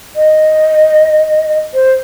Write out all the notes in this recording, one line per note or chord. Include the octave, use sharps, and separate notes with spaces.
D#5
C5